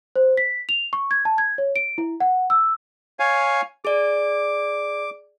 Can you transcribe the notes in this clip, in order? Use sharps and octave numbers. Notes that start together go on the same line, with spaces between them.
C5
B6
F7
C#6
G#6
A5
G#6
C#5
D7
E4
F#5
E6
C#5 F5 G#5
G#4 D5 D6